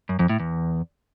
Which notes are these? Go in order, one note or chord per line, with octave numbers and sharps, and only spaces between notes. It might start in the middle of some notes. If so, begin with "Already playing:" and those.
F#2
F2
A2
E2